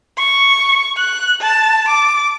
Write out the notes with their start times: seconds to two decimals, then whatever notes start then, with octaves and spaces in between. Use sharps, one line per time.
0.18 C#6
0.97 F#6
1.41 A5
1.88 D6